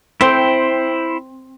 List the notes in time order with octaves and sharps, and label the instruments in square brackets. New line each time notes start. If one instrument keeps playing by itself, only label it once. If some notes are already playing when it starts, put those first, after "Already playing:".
[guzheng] C4 [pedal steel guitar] E4 C5 G5